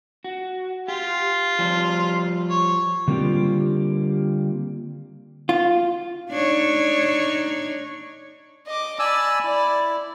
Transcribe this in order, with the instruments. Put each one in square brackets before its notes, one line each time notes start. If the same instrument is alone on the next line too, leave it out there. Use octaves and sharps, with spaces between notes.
[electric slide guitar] F#4
[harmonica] F4 [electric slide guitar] G4
[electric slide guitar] F3 G3 G4
[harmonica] C#5
[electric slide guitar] D3 G3 A#3 C4 F4 G4
[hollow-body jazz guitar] F4
[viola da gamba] D4 D#4 C#5
[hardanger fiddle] D#5 D6
[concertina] D5 G#5 E6 [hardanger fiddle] A5 B5
[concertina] E4 [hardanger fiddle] D5